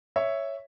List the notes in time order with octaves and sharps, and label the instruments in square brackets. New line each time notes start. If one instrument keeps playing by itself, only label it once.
[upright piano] C#5 E5